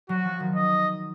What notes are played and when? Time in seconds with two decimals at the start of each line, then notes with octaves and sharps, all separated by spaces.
0.09 F#3 F#4
0.25 F3
0.40 D#3
0.56 D#5